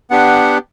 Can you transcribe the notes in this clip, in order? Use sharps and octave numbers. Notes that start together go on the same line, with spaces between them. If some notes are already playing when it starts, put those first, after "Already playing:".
B3 D4 G4 F#5